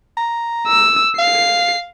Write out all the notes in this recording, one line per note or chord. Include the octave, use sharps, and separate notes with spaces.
A#5
E6
F5 C7